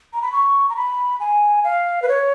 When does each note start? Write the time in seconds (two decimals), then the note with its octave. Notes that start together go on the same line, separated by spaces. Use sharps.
0.14 A#5
0.22 B5
0.32 C#6
0.69 A#5
0.76 B5
1.20 G#5
1.64 F5
2.02 B4
2.08 C#5